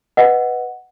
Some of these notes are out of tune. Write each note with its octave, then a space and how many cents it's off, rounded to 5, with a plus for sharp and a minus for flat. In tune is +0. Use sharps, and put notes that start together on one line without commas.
B4 +0 D#5 +0 F#5 +0